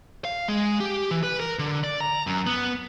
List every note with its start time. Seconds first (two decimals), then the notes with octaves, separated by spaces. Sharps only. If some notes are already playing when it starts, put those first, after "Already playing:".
0.25 F5
0.48 G#3
0.80 G4
1.11 E3
1.23 B4
1.40 A#4
1.59 D3
1.84 D5
2.01 A#5
2.27 F#2
2.47 B3